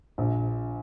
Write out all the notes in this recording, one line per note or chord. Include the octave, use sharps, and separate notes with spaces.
A#1